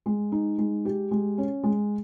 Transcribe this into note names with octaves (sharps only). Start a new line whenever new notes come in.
G#3
D#4
G#3
G4
G#3
C#4
G#3